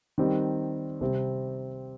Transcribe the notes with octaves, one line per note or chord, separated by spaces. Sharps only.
D#3 G3 C4 D#4
C3 G3 C4